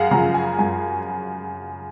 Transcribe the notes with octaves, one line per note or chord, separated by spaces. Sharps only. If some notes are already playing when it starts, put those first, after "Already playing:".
Already playing: F#2 G#4 F5 F#5
C#3 F3 A#5
G#5
F#2 G#5